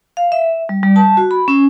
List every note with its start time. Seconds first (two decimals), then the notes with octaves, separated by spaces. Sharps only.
0.17 F5
0.32 E5
0.69 G3
0.83 G3
0.96 A5
1.17 F#4
1.31 B5
1.48 C#4